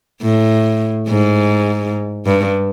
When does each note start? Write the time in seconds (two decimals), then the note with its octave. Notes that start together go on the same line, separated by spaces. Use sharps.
0.22 A2
1.09 G#2
2.26 G2